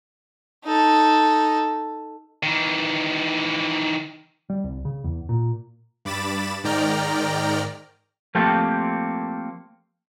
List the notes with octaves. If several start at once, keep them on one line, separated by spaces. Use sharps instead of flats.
D#4 A4
D#3 E3
G3
C2
C#3
E2
A#2
G2 B5 D6 A6 E7
G#2 D#3 D5 G5 A#5 F6
F3 A3 A#3 C4 G4 A4